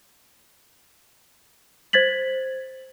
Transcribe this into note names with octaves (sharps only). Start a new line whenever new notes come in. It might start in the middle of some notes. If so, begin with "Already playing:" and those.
C5 G#6 A6 B6 F#7